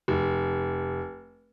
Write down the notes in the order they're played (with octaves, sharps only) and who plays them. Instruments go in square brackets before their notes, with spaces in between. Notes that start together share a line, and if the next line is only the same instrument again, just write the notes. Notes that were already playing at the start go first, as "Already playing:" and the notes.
[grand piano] F1